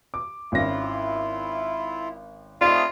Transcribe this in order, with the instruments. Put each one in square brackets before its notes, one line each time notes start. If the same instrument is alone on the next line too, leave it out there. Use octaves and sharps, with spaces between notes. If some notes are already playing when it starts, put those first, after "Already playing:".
[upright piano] D6
[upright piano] G#1 C#4 A#6 [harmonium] E4 F4
[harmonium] A3 C4 D#4 [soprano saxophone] F4 [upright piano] D5 F5